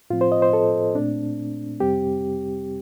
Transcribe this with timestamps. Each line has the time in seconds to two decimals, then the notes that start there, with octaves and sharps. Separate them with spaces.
0.10 A2 F3 C4 F4
0.21 C5
0.32 D#5
0.42 C5
0.53 A4
0.95 A#2 A3 C4 D4
1.80 F2 C3 G3 C4 G4